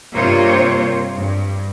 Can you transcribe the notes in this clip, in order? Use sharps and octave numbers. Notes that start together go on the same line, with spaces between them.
G2 C3 A#3 F4 C5 C#5
G2